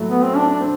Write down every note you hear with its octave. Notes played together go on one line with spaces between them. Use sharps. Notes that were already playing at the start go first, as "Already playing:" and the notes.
Already playing: A2 F#3 A3
B3
C4
D4
D4
C4